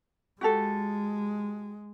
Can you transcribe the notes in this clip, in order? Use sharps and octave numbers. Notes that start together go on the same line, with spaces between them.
G#3 F#4 G4 A4